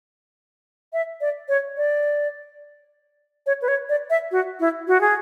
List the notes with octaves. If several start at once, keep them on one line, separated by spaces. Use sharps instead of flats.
E5
D5
C#5
D5
C#5
B4
C#5
D5
E5
F#4
E4
F#4
G#4